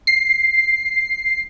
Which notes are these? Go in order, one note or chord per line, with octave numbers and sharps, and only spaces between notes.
C7